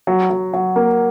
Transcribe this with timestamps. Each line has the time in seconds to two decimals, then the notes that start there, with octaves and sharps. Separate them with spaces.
0.07 F#3
0.30 F#3
0.53 F#3
0.76 A#3